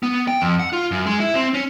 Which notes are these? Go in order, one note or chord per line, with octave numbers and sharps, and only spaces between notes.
B3
G5
F2
F#5
F4
F#2
G#3
E4
C4
C#4